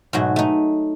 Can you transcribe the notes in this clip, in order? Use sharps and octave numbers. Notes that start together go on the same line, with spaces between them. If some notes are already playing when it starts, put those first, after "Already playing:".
G#2 B2 F#3 A3
A3 D#4